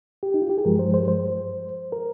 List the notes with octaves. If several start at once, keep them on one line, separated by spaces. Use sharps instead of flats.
G4
D#4
F4
G4
G#4
G2 F3 G#3 A#4
C5
C5
C5
A#4